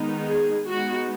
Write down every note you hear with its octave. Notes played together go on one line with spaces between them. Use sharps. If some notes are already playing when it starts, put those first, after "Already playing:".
Already playing: D#3 G#3 B3 D#4
G#4
G#3 B3 D#4 F#4